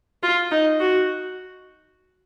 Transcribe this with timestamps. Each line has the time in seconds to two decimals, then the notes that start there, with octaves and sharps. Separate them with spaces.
0.23 F4
0.51 D#4
0.80 F#4